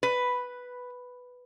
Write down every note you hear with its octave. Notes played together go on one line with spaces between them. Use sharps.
B4